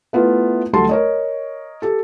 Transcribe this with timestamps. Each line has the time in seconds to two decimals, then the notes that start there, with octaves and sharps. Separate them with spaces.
0.13 A3 B3 E4 F4
0.73 D2 F#3 G3 A4 A5 C6
0.89 A#4 C#5 D#5
1.82 G4 A4